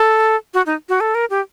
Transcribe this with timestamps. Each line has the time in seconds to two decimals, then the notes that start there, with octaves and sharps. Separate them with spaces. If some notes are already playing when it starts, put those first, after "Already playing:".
Already playing: A4
0.54 F#4
0.66 D#4
0.89 F#4
1.00 A4
1.15 A#4
1.30 G4